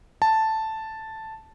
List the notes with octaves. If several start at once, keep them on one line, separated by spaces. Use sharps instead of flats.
A5